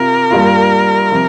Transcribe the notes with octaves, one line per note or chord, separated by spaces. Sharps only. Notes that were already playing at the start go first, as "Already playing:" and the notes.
Already playing: C3 F4 A#4
G2 G3 A#3 F4
C3 F3